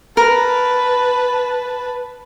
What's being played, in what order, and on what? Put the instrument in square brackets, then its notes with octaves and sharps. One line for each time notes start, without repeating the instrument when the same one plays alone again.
[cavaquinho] A#4 [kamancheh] B4 A5